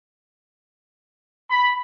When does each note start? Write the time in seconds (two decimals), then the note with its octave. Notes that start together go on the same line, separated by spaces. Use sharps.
1.50 B5